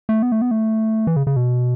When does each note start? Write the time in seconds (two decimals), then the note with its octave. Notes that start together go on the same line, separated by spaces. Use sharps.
0.09 A3
0.22 B3
0.32 A3
0.42 B3
0.51 A3
1.07 E3
1.16 C#3
1.27 C#3
1.36 B2